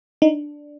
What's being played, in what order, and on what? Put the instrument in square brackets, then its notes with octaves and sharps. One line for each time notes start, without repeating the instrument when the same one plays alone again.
[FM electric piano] D4 D#4